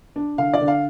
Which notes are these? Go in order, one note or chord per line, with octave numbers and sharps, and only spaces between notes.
D4
D3 F5
D5
D3
F5